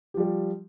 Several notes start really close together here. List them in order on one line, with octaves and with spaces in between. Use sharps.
G4 F3 G3